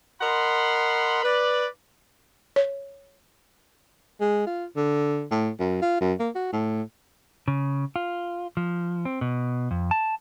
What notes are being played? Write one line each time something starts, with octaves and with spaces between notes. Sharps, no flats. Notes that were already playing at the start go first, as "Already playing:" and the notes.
A#4 D#5 F#5 B5 C6
B4 D5
C#5
G#3
F4
D3
A2
F#2
F4
F#2
A#3
F#4
A2
C#3
F4
F3
C4
B2
F2
A5